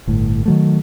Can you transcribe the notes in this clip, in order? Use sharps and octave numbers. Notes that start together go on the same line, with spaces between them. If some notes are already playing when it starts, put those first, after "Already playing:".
G1 A2
D#3 F#3 A3